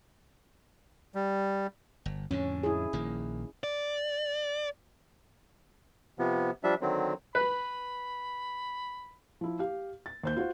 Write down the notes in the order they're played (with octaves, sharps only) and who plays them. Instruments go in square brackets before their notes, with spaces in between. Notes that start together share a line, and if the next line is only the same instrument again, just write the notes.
[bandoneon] G3
[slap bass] G1
[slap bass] F2 A2 D3 [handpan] C#4
[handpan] E4 G#4
[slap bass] A#1 D#3 A#3
[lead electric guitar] D5
[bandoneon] C3 F3 B3
F3 G3 D4 E5
D3 D#3 F#3 C4
[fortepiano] B4 [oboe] B5
[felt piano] F3 E4
G4 F5
A6
D#2 C5 G6
F4 F#4 C5